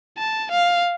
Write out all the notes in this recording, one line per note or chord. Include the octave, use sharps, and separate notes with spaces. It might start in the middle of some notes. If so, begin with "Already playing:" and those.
A5
F5